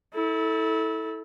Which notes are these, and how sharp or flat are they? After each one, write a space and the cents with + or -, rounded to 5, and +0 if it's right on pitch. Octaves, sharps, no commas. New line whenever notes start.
E4 -30 A4 +0